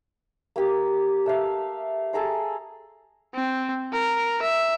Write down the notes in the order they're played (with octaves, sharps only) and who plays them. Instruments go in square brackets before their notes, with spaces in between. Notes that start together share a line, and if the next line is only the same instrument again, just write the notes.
[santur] A#3 G4
A3 E5 F5
G#4 A4 A#5 C6
[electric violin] C4
A#4
E5